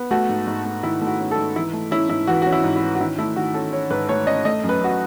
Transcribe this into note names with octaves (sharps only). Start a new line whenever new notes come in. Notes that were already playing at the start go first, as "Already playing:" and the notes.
Already playing: B3
A3 F#4
G#2
G#2
A3
D#3 E4
A3
F#4
C#4
A4
G#2
E3 E4
A3
C#4 E4
G#2 E4
E3 F#4
C#4 F#4
E4
G#2
E4
C#4
F#4
D#3 E4
A3 E4
D#3 F#4
C#4 A4
C#4 C#5
G#2 B4
A3 C#5
C#4 D#5
A3 D#5
F#2
B4
F#2 F#4